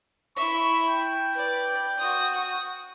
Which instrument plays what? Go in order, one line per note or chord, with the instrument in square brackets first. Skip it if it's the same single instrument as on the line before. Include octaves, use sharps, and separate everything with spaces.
[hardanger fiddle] E4 E5 [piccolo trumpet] C#6
[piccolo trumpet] G5
[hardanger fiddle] B4 D5
F#4 D#6